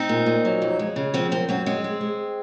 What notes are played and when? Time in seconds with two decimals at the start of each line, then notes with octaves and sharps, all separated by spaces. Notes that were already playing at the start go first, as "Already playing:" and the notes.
Already playing: C4 D#4
0.09 A#2
0.26 A#2
0.45 F#3
0.62 F2
0.79 G#3
0.96 C#3
1.14 F3 C4
1.31 F#2 C4
1.49 F#2 C4
1.66 G#3 C4
1.84 G#3
2.01 G#3